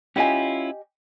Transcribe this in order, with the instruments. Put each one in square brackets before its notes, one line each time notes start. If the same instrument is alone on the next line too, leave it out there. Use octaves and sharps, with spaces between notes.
[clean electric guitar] C#4 E4 F4 [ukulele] G4 D#5 G#5